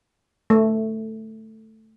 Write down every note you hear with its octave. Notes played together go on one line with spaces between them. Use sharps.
A3